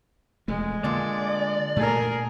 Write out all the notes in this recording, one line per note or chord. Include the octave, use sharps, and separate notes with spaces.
E1 F2 G#3 A3
A#2 D3 D4 D5
A#2 A3 G#4 A#4